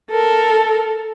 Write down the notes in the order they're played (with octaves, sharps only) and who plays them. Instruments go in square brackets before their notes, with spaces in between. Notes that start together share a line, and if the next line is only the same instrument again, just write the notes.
[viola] A4 A#4